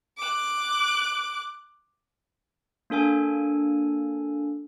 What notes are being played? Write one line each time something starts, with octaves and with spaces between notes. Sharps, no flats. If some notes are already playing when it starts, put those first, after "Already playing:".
D6 F#6
A#3 D4 A4 G#5